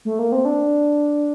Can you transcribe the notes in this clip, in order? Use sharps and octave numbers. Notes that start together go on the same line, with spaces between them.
A3
A#3
C4
D4